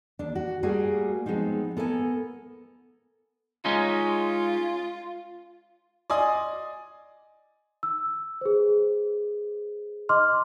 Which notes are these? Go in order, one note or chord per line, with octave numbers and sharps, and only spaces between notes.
D#2 D4
F#4
G3 A3 A#3 F#4 G#4
F3 G#3 B3 C4 D#4
B3 A4 A#4 E5 G#5
G#3 C#4 D#4 F4
D5 D#5 G#5 C6 D#6
E6
G#4 B4 C5
D#5 C6 D6 F6